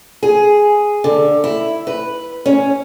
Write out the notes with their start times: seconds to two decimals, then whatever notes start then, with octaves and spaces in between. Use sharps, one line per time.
0.23 G#4
1.04 D3
1.44 E4
1.87 B4
2.46 C#4